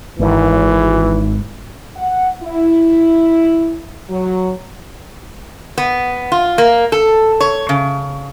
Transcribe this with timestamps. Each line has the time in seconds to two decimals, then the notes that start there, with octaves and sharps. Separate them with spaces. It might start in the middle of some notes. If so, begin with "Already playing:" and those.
0.19 G#1 E3
1.97 F#5
2.43 E4
4.09 F#3
5.78 B3
6.32 F4
6.58 A#3
6.92 A4
7.40 C#5
7.69 C#3